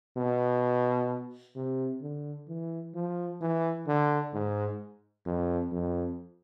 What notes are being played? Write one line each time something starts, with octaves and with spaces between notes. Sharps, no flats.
B2
C3
D3
E3
F3
E3
D3
G#2
F2
F2